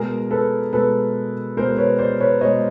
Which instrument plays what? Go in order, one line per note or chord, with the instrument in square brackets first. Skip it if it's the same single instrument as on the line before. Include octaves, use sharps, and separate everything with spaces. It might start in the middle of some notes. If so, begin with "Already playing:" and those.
Already playing: [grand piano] B2 G#3 G#4 A#4
A4 B4
B2 G#3 A4 B4
B2 G#3 A#4 C5
B4 C#5
C5 D5
B4 C#5
B2 G#3 C#5 D#5